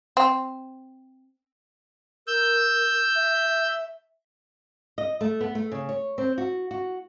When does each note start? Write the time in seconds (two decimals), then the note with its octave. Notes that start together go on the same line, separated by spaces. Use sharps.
0.17 C4
2.27 A#4 E6 G6
3.16 E5
4.98 D#5
5.21 A3
5.41 B3
5.55 A3
5.72 C#3
5.89 C#5
6.18 C4
6.38 F#4
6.71 F#4